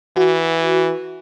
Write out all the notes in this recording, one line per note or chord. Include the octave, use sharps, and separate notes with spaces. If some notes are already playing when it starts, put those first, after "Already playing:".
E3 F#4